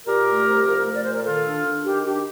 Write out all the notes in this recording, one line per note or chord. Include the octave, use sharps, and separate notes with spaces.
A#2 G4 A#4
A3
C2
F3
A3
D5
A#2 C5
A#4
D#3 F4 A4
D4
D4
D#3 G4
D4 G4